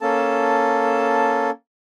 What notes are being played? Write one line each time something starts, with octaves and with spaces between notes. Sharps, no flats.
A#3 C#4 A4 A5